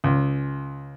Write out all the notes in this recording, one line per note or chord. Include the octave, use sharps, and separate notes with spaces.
C#2